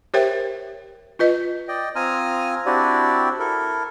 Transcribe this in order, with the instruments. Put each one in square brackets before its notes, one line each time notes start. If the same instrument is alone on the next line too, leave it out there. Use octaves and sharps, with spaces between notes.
[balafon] G4 A#4 C5 C#5 E5 G5
F4 B4 D#5
[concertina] D5 D#5 G5
C4 F4 G#5 A#5 D#6 F6
C4 D4 E4 F#4 G4 D5
E4 A4 A#4